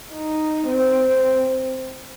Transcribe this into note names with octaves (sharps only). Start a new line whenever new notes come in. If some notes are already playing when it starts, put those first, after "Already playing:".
D#4
C4